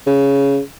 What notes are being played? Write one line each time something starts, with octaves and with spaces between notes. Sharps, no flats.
C#3